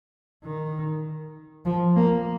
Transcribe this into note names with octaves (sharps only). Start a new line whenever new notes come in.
D#3
F3
A#3